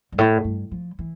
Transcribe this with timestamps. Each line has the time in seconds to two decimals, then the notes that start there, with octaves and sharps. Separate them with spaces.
0.12 G2
0.18 A2
0.44 G2
0.71 F3
0.99 E3